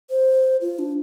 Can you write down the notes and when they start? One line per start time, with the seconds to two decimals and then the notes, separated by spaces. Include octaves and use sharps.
0.10 C5
0.61 F4
0.79 D4